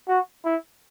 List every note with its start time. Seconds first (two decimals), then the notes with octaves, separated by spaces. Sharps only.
0.08 F#4
0.45 E4